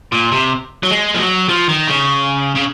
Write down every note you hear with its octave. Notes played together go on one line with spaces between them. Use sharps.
A#2
C3
F#3
G#3
F3
F#3
F3
D#3
C#3
C#3